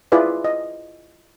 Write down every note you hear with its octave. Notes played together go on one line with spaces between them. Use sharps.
E4 F4 G#4 B4 D5
D#5